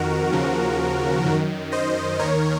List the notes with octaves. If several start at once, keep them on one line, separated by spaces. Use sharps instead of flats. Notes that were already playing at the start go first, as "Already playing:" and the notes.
Already playing: F2 D#3 F#4 A#4
D#2 C#3 F3
F#2 D#3
C5 D#5
D#2 D#3 A#4 C#5